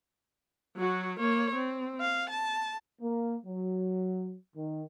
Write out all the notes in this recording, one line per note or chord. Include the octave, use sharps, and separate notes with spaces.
F#3 F#4
A#3 C#5
C4
F5
A5
A#3
F#3
D#3